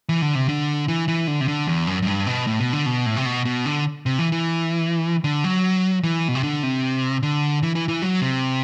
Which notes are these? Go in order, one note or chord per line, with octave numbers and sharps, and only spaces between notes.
E3
D3
C3
D3
E3
E3
D3
C3
D3
E2
F#2
F#2
G2
B2
A2
B2
D3
B2
A2
C3
B2
B2
D3
C3
E3
E3
D3
F#3
E3
B2
C3
D3
C3
D3
E3
E3
E3
F#3
C3